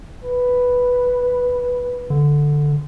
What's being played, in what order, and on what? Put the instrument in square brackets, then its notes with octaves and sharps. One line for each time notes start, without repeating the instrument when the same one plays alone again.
[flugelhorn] B4
[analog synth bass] D3